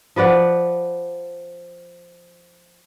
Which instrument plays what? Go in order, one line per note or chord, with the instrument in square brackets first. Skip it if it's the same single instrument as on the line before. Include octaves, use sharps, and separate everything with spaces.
[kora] F3 B4 D5 F#5